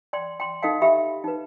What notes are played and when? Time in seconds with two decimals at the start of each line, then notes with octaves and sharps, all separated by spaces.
0.13 D5 G5 C6
0.40 G5 C6
0.63 D#4 A4 D#5 F5 G5
0.82 G4 E5 G5 B5
1.24 D#4 B4